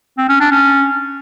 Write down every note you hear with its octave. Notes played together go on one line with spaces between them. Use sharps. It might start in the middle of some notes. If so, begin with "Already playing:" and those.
C4
C#4
D4
C#4